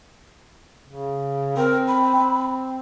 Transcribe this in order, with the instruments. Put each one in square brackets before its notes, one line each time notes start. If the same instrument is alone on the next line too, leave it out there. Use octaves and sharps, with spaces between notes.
[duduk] C#3
[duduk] C4 [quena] A#4
[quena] B5
[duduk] C4